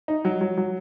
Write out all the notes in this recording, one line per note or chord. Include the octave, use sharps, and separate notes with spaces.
D#4
F#3
F#3
F#3